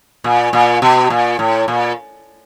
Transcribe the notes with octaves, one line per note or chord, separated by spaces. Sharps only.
A#2
A#2
B2
A#2
A2
A#2